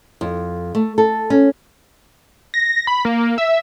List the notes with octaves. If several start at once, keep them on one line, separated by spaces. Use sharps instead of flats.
F2
A3
A4
C#4
A#6
B5
A#3
E5